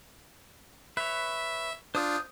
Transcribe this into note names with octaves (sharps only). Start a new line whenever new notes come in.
B4 C#5 E5
D4 F4 C5 D#6 G6